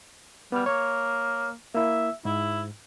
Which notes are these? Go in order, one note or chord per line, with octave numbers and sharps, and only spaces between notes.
G3 B3 F6
A#3 C#5
A#3 E4 E5
G#2 E4